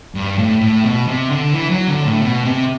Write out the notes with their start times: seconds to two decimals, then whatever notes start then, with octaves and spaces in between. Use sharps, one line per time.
0.15 G2
0.39 A2
0.61 A2
0.84 B2
1.08 C3
1.30 D3
1.52 E3
1.70 F#3
1.88 D3
2.05 A2
2.22 B2
2.45 C3